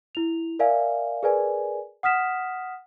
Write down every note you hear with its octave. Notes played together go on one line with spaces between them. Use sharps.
E4 F7
A#4 D5 E5 F5 G#5
G#4 A#4 B4 D5 G#5
F#5 D#6 F6 B6 E7